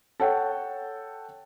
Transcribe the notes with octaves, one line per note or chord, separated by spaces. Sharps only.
A4 C#5 F#5 G5